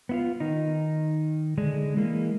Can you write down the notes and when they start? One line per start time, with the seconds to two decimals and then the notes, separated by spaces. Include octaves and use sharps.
0.09 B3 E4 F4
0.40 D#3 D#4
1.57 D3 G#3 D4
1.97 E3 G#3 A#3